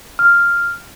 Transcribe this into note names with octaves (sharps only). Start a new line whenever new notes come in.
F6